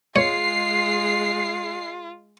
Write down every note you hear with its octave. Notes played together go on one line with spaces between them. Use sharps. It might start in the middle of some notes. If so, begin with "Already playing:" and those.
G#3 F4 C#5 C7